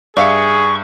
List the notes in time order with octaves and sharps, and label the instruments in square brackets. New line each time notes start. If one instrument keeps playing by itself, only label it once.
[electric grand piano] G2 E5 C#7 [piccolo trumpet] G#4 [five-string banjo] D5 F5 G5 [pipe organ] C#6